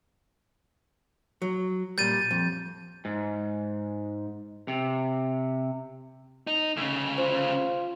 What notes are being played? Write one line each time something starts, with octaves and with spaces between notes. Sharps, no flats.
F#3
A#2 G3 G6 A6 D#7
F2
G#2
C3
D#4
D2 C#3
F4 C5